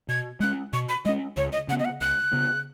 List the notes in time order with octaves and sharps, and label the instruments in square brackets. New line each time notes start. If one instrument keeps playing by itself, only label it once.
[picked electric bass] B2 [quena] G#6
[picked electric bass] G#3 C#4 [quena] F#6
[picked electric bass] B2 [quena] C#6
[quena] B5
[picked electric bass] G#3 C#4 [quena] D#5
[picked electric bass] C#2 [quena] C#5
[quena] D#5
[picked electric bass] C#3 [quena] F#5
[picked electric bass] B3
[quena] D#5
F#5
[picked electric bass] C#2 [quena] F#6
[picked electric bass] C#3 B3